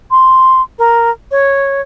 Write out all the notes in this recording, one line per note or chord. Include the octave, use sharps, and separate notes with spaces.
C6
A#4
C#5